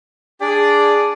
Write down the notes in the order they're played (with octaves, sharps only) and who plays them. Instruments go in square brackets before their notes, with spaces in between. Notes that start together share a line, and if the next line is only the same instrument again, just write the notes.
[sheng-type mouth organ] D4 D5 [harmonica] G#4